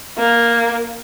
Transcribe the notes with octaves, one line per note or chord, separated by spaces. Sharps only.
A#3